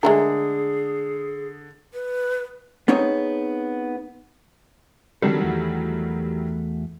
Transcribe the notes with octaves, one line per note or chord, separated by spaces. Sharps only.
D3 G#3 A3 G#4 A#4
B4
B3 C4 D#4 G#4 C#5
D#3 F#3 G3 C4 D4 A4
E2 A3 F#4